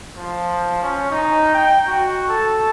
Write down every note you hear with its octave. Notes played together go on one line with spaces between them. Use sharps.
F3
C#4
D#4
G5
F#4
A4